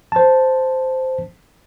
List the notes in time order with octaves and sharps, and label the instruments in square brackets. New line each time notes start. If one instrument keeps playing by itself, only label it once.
[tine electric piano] C5 A5